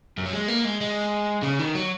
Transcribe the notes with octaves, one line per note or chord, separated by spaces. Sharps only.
F#2
F#3
G#3
A#3
G#3
G#3
C#3
D#3
F#3